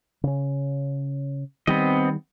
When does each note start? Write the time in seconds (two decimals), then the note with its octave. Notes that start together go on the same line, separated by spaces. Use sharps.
0.23 C#3 C#4
1.67 D#3 G3 B3 C4 D#5